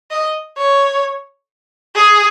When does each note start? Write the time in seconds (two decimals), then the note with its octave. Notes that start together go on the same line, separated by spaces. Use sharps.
0.11 D#5
0.57 C#5
1.96 G#4